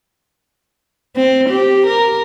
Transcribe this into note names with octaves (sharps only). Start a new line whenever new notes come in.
C4
G4
A#4